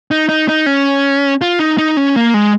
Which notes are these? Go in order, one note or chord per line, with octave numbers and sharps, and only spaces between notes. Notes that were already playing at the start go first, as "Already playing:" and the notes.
D#4
D#4
D#4
C#4
F4
D#4
D#4
C#4
A#3
G#3